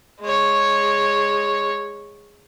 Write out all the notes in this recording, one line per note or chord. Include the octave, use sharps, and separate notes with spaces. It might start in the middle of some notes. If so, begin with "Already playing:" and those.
G#3 C#5